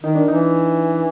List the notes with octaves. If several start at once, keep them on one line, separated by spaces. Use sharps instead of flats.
D#3 D#4
D4
E3 D#4